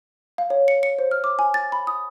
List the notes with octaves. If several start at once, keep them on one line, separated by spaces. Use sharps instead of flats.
F5
C#5
C#7
C#7
C5
F6
D6
G#5
A6
B5
D#6